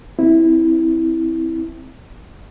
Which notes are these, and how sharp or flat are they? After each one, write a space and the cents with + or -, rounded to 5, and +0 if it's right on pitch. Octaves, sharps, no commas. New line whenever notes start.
C4 +0 E4 -10